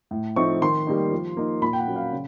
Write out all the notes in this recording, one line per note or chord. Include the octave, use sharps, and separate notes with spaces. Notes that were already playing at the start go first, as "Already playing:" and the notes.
A2
F3 A3 C4 D#4 C#6
D#3 C6
G3 A#3 D#4
F3
A#3 D#4
A#2 B5
G5
F#5
F#3 A#3 C#4
F5
C#3